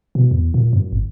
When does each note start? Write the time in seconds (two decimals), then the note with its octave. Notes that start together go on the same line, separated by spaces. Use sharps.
0.15 B2
0.31 E2
0.54 A#2
0.73 F#2
0.93 G#1